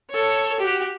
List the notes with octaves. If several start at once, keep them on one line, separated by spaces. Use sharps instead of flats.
A4 C#5
F#4 G4